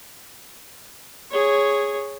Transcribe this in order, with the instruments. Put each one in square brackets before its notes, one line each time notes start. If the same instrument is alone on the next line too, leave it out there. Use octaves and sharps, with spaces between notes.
[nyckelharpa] G#4 C#5